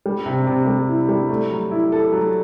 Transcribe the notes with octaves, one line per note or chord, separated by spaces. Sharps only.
G3
C3
C3
G3
E4
G3
A3
F#3
E4
A4
F#3